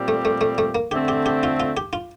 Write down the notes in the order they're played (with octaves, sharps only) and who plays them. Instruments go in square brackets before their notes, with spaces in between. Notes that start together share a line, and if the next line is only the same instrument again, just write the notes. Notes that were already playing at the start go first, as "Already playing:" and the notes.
Already playing: [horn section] A#2 G3 C4 G4
[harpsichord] A3
A3
A3
A3
A#3
[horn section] D3 A3 C4 [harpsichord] G4
[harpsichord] G4
G4
F4
F4
G4
F4